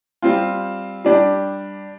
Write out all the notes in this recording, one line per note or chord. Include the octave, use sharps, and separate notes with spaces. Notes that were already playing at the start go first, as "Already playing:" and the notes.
G3 C4 F4
G3 D4 G4